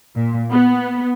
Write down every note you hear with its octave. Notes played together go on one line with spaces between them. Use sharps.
A#2
B3